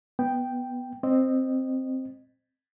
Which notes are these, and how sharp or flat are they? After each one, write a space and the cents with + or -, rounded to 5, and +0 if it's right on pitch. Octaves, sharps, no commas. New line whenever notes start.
B3 +0 G5 +0
C4 +0 D#5 -20